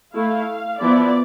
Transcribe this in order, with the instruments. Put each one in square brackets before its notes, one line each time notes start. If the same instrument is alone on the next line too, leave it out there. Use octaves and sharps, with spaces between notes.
[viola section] A3 E4 F5
F3 B3 E4 D5